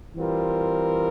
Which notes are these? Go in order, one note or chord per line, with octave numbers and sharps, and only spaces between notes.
E3 G3 C4 F4 A#4